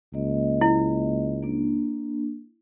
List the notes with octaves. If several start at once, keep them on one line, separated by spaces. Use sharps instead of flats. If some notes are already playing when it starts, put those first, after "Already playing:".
C#2 A#3 D#5
E4
A#3 D4